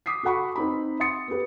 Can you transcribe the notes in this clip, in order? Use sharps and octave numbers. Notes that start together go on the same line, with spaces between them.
D6 D#6 B6 C7
F#4 A4 F5 F#5 B5 C#6
C4 D#4 B5
E5 F#5 C6 D#6 A6 C#7
B3 G4 B4